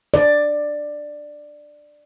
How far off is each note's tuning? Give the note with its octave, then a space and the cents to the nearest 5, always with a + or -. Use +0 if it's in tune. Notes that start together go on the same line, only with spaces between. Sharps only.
D5 +10